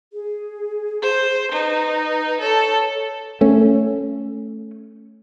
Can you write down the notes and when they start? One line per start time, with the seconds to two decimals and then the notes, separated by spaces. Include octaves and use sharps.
0.13 G#4
1.02 C5
1.52 D#4 B4
2.41 A4 C#5
3.41 A3 C#4